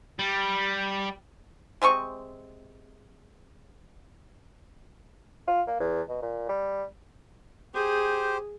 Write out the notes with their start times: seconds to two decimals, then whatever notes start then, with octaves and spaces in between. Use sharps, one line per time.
0.19 G3
1.82 C3 G#3 C4 C#6
5.48 F4
5.68 A#3
5.80 E2
6.09 B2
6.22 A#2
6.49 G3
7.75 G4 G#4 C5